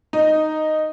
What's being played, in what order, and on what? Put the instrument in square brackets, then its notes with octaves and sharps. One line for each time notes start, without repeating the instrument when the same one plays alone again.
[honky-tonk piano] D#4